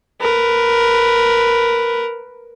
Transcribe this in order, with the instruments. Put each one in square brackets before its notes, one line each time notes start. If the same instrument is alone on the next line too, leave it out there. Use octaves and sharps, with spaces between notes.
[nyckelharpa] A#4 B4